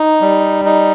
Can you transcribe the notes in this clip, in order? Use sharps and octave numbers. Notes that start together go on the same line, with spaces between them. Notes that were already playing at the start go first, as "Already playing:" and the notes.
Already playing: D#4
G3
D#4